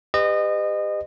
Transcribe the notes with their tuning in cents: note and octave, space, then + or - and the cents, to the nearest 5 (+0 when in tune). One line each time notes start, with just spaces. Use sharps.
G4 +35 B4 +45 D#5 -25